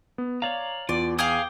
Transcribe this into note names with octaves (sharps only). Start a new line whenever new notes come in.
B3
C#5 D5 F5 A#5
E2 F4 D5
G#4 F5 G5 G#5 D6 D#6